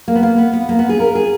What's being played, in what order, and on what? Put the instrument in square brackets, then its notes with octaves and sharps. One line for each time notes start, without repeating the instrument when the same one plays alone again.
[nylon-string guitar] A#3
B3
A#3
B3
B3
A#3
B3
G#4
A#4
G#4